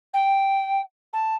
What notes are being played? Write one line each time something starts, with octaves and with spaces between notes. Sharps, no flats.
G5
A5